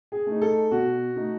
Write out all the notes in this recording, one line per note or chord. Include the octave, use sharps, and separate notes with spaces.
G#4
A3 D#4
A4
B2 F#4
A3 D#4